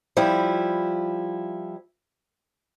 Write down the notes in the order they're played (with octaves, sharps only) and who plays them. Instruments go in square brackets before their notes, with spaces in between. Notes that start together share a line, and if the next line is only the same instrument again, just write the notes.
[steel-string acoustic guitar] F3 G3 E4